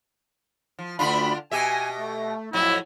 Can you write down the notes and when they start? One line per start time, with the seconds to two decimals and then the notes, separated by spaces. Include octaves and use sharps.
0.79 F3
0.99 D2 D3 D4 F4 B5
1.51 B2 G4 E5 G#5
1.98 A3
2.53 F2 A2 F#3 E4